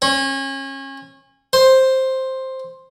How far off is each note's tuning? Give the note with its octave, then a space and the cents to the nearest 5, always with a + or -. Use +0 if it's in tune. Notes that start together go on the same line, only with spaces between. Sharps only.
C#4 -30
C5 +5